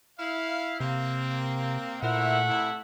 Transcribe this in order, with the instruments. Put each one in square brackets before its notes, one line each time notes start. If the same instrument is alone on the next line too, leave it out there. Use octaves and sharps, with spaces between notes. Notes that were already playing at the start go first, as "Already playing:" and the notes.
[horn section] E4 F5
[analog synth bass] C3 [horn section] A#3 C4
[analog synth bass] A#2 [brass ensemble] A3 E5 F#5 [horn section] E4 A#4 C5
[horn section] C3 E4